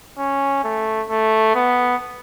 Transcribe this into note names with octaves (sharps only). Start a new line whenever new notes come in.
C#4
A3
A3
B3